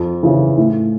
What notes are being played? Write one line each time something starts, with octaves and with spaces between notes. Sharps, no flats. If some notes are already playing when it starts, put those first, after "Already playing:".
Already playing: F2
C#3 E3
A2